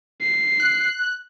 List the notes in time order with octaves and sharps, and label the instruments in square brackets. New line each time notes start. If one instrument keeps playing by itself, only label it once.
[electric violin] C7
[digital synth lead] F#6